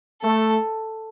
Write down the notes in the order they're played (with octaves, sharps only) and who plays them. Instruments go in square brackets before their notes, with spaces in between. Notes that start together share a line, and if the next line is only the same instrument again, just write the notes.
[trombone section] A3 [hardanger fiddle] A4